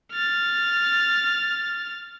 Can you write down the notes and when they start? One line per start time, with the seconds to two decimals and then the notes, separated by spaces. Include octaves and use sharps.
0.12 F6 A6